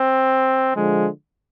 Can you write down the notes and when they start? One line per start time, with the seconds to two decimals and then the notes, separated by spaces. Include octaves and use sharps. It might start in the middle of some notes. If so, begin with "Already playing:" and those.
Already playing: C4
0.74 D3 F3 G#3